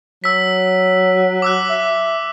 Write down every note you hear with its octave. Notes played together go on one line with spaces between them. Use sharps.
F#3 E6 B6
D6 E6 F#6
E5